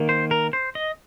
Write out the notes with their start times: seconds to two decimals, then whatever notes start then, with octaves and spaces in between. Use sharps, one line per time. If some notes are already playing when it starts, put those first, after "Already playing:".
Already playing: D#3 A#3
0.09 C5
0.31 A#4
0.53 C5
0.75 D#5